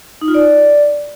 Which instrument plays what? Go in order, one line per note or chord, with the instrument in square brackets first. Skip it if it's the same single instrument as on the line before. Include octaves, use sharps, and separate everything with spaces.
[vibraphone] D#4
F4
D5